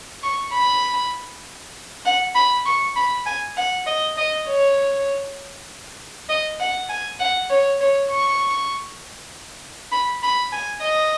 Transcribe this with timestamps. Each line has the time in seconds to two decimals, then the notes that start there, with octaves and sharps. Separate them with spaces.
0.23 C#6
0.54 B5
2.05 F#5
2.35 B5
2.66 C#6
2.96 B5
3.26 G#5
3.57 F#5
3.86 D#5
4.17 D#5
4.48 C#5
6.29 D#5
6.60 F#5
6.90 G#5
7.20 F#5
7.50 C#5
7.81 C#5
8.11 C#6
9.92 B5
10.23 B5
10.53 G#5
10.83 D#5